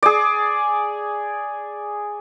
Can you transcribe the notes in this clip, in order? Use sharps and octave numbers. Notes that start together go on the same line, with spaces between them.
G#4 D5